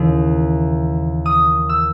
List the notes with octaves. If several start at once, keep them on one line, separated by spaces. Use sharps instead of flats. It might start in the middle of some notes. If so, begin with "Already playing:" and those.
Already playing: D#2 C#3 E3
D#6
E6